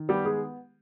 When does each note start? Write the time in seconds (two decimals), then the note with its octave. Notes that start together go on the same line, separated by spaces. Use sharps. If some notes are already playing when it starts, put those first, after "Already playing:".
Already playing: D#3
0.09 G3 B3 G4
0.25 G#3 G#4